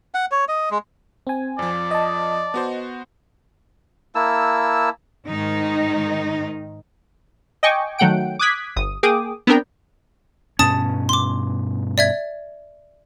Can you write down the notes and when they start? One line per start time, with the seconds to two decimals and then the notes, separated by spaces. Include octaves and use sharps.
0.14 F#5
0.31 C#5
0.48 D#5
0.71 G#3
1.27 C4 G#5
1.59 F2 F3 D5
1.91 D#5 A5
2.54 B3 F#4 C5
4.15 A#3 E4 A5 E6
5.27 G#2 D#3 D#4
7.63 D#5 G5 G#5 C#6 D6
7.98 D#3 F#3 A3 F#5 G5 D7
8.39 D6 D#6 F#6 G#6 B6
8.76 G1 D#6
9.03 A#3 G#4 G5 D6 D#6
9.47 B3 C4 D4 A#4 G5
10.59 G2 B2 C#4 A5 D#6 A6
11.09 C6 D6
11.98 D5 E5 G#6